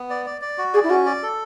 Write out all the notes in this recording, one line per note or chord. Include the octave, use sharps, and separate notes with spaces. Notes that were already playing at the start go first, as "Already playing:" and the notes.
Already playing: B3
D5
D5
D5
F#4
G#4 D5
E4
C#4 F#4
D5
A4